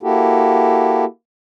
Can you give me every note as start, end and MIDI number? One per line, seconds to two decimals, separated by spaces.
0.03 1.05 58
0.03 1.05 64
0.03 1.05 66
0.03 1.05 67
0.03 1.05 69